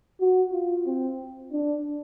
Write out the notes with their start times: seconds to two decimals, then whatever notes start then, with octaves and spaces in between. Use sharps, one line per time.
0.20 F#4
0.52 F4
0.87 C4
1.52 D4